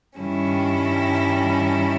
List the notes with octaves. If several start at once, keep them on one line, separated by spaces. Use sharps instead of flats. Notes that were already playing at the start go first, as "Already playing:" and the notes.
G2 D#3 G3 C#4 E4